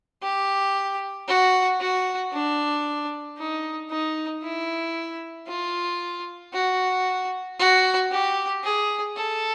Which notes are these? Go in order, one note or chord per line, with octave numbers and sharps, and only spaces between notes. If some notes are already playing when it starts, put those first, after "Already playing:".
G4
F#4
F#4
D4
D#4
D#4
E4
F4
F#4
F#4
G4
G#4
A4